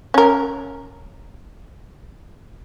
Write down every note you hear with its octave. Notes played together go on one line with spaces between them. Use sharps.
C#4 A#4